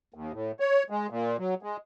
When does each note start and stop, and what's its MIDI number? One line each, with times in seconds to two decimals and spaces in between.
0.14 0.32 39
0.33 0.52 45
0.60 0.83 73
0.90 1.07 56
1.10 1.37 46
1.39 1.55 54
1.63 1.77 56